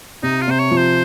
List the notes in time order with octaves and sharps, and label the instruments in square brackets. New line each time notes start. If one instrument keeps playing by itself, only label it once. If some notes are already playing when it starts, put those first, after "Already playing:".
[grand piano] C3 [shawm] D#4
[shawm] F4
[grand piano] C3 [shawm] C5
[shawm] C#5
[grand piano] F3
[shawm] C5